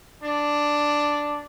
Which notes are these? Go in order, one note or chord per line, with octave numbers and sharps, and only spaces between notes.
D4